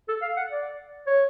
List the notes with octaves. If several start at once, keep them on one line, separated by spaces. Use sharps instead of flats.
A4
F5
F#5
D5
C#5